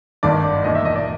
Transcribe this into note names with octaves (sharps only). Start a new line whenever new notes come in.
G#1 G2 D#3 D5
E1 D#2 D#3 D#5
E5
D#5
D5